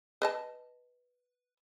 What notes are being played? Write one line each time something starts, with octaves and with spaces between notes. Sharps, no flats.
B4 D#5 A5